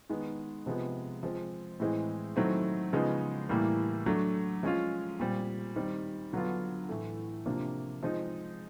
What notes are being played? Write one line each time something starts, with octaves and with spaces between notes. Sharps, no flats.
D#3 G#3 B3
C3 F3 G#3 B3
F3 G#3 C4
A2 E3 G#3 C4
D#3 F#3 A3 C4 E4
C#3 F3 G#3 B3 D#4
A2 E3 G3 A#3
F#3 A3 D4
F3 G#3 C#4 F4
A#2 G3 C4
D#3 G3 C4
D3 F#3 B3 D4 F4
A2 E3 A3
C3 F3 A#3 D4
F3 G#3 C4 D#4